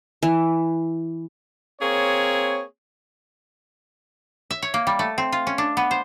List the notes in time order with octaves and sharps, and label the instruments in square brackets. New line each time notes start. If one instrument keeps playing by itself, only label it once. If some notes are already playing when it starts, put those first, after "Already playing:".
[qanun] E3
[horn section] A#3 C4 G#4 C#5
[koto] E5
C#5
A#3
G3
A3
C4
F4
C#4
D4
B3
C5